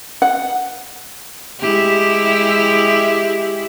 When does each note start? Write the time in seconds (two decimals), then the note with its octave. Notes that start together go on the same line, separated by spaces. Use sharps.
0.22 F#5
1.60 G#3 E4 G4